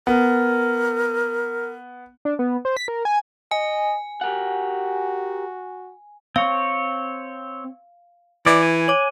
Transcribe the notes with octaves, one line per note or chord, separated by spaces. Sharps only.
B3 A#4
D4
B3
C5
B6
A#4
G#5
D#5 G#5
F#4 G4 A#4 F#5
C4 C#5 F5
E3 D5
G#5
C#5 D6